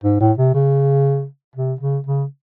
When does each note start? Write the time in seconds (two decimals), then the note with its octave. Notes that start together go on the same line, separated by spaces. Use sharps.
0.04 G#2
0.20 A2
0.38 C3
0.54 C#3
1.56 C3
1.81 C#3
2.07 C#3